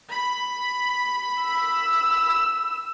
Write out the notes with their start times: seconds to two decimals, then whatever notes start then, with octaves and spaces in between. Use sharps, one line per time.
0.10 B5
1.40 E6